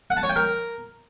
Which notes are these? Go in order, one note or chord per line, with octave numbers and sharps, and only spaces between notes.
F#5
A5
C#5
G5
A#4